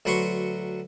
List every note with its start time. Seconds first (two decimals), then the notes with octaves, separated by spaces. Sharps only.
0.05 D2 F#3 B4 F#5 C6 C#6